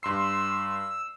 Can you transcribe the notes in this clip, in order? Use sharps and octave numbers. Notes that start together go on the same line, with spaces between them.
G2 C6 E6 C7